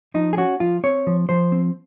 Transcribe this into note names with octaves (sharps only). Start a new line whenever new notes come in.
F3 D#4
G#4
C#4 F#4
F3 F4
C4 C#5
F3
F3 C5
C4